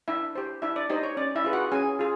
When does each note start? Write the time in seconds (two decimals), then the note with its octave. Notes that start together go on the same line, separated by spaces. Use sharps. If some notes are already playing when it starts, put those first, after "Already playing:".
0.08 D4 E4 E5
0.35 G4 C5
0.62 D4 E4 E5
0.76 D5
0.90 D#4 G4 C5 D#5
1.03 C#5
1.17 C#4 D5
1.35 E4 E5
1.44 F4 G#4 B4
1.53 F#4 F#5
1.72 C#4 G#4 G#5
1.99 F4 G#4